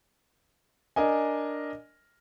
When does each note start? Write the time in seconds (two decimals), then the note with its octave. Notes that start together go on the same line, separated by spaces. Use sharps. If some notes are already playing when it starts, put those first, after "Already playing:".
0.96 D4 A#4 D#5 G#5